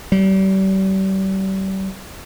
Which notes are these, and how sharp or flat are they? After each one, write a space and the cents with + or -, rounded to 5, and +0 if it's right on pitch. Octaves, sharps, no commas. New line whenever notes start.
G3 -35